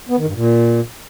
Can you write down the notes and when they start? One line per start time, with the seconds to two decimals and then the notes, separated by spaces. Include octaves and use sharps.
0.09 B3
0.18 D#3
0.26 G2
0.35 A#2